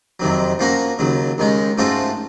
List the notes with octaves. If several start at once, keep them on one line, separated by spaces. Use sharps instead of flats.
F2 C3 D#3 F#3
F3 A#3 C#4 F#4 A#4
D#2 C#3 F#3
D#2 D#3 G#3 C#4
G#2 F3 A3 C#4 F#4